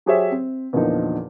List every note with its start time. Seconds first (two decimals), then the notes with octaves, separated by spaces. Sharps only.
0.06 F#3 G4 G#4 C5 C#5 E5
0.31 C4
0.73 E2 A#2 D3 F3 D#4